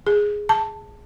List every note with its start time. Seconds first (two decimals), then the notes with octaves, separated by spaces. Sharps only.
0.07 G#4
0.49 A5